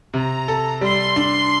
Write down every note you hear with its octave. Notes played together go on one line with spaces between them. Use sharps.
C3 A#5
A4
G3 C6
D4